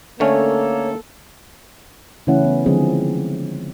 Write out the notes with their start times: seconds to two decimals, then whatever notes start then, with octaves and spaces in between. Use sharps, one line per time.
0.20 D3 A3 A#3 C#4 A4 C#5
2.27 C#3 E3 A3 C#4 E4 F#5
2.44 B3
2.66 D3 F3 G#3 C4 G#4